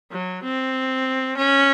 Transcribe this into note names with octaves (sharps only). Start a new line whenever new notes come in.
F#3
C4
C#4